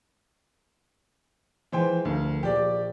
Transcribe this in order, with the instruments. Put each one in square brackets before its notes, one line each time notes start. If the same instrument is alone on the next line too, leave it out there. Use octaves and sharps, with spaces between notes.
[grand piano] E3 C5 G5 [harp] F3 G#3 E4
[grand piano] D2 [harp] A4 A#4 F5
[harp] A#1 [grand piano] G4 D5